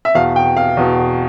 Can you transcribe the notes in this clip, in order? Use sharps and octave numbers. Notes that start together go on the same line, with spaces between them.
E5
E2 B2 F5
G5
F5
E2 B2